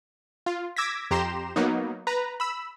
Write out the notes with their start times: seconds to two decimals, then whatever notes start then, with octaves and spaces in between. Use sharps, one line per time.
0.46 F4
0.77 D6 E6 G#6 A#6 B6
1.11 F2 G4 A#5 C6 E7
1.56 F#3 A#3 B3 D#4
2.07 B4 A#5
2.40 B5 E6